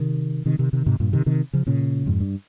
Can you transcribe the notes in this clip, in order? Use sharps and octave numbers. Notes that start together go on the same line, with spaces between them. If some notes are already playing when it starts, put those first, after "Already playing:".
Already playing: C3 D#3
C3 D#3
C3 D#3
C3 D#3
G#2 C3
G2 A#2
C3 D#3
C3 D#3
C#3 F3
A#2 C#3
F2 G#2
G2